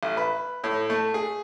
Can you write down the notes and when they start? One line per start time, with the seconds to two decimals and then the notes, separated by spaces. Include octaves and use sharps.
0.03 A1
0.17 B4
0.64 A2
0.90 A3
1.14 G#4